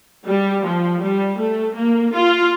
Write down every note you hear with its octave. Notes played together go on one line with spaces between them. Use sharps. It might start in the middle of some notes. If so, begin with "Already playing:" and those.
G3
F3
G3
A3
A#3
F4